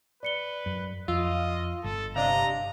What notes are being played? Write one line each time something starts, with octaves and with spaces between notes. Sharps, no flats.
B4 D5 C#7 G7
F#2
F2 F4 D#5 E6
G1 A4
C3 D4 D#5 F5 A#5